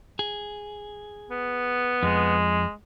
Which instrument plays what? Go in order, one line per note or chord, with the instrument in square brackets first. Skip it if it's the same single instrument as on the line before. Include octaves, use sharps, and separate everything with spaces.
[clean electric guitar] G#4
[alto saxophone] B3
[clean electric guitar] F2 [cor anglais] G#3